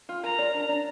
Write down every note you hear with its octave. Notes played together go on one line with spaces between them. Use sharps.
F4
A#4 A#5
D5
D4
D4